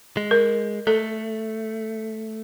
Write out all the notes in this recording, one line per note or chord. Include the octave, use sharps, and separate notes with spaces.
G#3
A#4
A3 A4